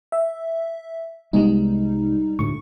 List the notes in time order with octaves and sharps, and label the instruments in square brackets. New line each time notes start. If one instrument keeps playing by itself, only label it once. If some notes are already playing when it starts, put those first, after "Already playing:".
[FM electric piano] E5
[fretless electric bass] C2 G#3 B3 [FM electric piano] G3 D#4
[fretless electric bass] D2 A2 [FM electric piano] C#6